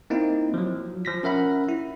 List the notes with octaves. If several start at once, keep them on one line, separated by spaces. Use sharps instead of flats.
A#3 C4 D#4 E4
F3 F#3
F3 A#6 B6
C#4 A#4 E5 F#5 B5
E4